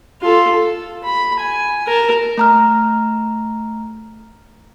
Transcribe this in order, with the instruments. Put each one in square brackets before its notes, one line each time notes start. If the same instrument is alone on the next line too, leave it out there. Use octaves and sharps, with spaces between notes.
[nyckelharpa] F4 A4
A4
B5
G#5
A#4 A5
[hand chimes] A3 A#5 F6